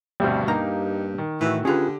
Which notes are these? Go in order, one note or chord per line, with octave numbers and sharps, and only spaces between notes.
D2 G2 B2 G3 C4
G2 A#3 D#4 G4 F5 A#5
D#3
A2 E3 F#4 E5
D3 C#4 F4 G4 G#4 B4